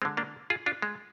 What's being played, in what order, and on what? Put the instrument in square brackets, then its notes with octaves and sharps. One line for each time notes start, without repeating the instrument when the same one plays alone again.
[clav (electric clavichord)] G#3 C4
D3
A#3 D4
F4 G#4
D4 F4
G#3